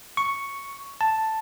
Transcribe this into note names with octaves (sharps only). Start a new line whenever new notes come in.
C#6
A5